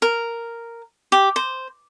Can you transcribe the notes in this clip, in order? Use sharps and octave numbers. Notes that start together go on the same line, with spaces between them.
A#4
G4
C5